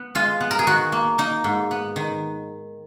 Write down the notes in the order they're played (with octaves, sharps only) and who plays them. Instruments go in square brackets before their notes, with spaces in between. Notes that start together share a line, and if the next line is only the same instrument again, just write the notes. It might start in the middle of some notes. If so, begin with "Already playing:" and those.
Already playing: [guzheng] B3
G#3 F4
B3
A#4
G#4
D#3 F#4
A#3
A#3 D#4
G#2
B3
D#3